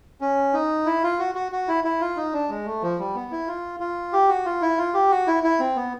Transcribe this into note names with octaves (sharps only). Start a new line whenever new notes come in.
C#4
D#4
E4
F4
F#4
F#4
F#4
E4
E4
F4
D#4
D4
G#3
A3
F3
G3
B3
E4
F4
F4
G4
F#4
F4
E4
F4
G4
F#4
E4
E4
C4
B3